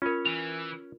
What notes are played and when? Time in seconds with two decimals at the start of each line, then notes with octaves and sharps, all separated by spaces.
0.02 C#4 F4 A#4 C#5
0.26 E3 F7